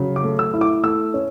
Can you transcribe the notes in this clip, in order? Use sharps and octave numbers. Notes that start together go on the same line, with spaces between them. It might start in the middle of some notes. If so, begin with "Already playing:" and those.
Already playing: C#3 F#3
D6
A3
E6
E4
D6
A3 E6
C#4